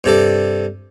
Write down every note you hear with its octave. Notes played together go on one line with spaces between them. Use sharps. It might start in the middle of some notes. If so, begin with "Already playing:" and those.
G2 C3 A4 D5